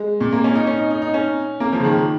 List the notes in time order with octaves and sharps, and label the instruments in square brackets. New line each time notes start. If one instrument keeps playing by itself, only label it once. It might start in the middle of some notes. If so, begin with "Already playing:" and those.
Already playing: [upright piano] G#3
A#2
A#3
C#4
D#4
C#4
D#4
D#4
D#4
C#4
A#3
F3
C#3
D#3